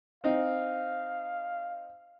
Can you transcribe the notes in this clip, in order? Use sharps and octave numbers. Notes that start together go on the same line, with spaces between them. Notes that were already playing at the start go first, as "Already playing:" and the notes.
C4 D#4 F5